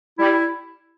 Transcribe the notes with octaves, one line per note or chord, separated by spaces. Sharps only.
G3 E4